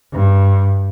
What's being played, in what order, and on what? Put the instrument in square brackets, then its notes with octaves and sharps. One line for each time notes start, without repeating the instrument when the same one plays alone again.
[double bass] G2